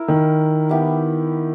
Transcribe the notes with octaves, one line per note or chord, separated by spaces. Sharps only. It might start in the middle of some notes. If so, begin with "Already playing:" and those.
Already playing: E4 A#4
D#3
B3 E4 G4